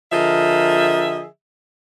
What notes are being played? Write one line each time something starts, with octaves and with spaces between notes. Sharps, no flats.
D3 F3 G#4 A#4 D#5 E5